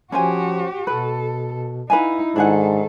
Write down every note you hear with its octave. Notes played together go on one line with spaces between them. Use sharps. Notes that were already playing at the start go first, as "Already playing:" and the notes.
F3 C#4 F#4 G4 C5 G#5
B2 A4 B4
D#4 E4 B4 F5 G#5
G#2 D#3 D4 G#4 A4 F#5